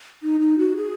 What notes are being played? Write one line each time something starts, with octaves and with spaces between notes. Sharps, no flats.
D#4
D#4
F#4
G#4